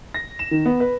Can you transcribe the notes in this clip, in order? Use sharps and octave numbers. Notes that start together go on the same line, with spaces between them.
A#6
E7
D#3
B3
B4